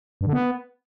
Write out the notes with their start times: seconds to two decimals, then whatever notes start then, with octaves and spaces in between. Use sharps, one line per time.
0.21 G2
0.27 D3
0.33 B3